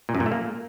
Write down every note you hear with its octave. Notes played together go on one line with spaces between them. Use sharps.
A#2
F#2
A#2
A3
A#3